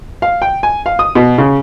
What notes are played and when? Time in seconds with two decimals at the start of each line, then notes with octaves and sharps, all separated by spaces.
0.22 F5
0.42 G5
0.63 G#5
0.86 F5
0.99 D#6
1.15 B2
1.38 C#3